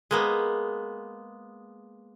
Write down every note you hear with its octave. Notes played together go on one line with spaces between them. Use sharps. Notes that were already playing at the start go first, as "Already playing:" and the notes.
G#3 A#3 B3